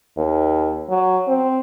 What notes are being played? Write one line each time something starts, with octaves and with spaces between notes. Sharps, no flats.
D#2
F#3
C4